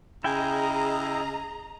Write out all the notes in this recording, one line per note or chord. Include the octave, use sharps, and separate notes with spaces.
C#3 E4 G#4 D#5 G5 G#5 A#5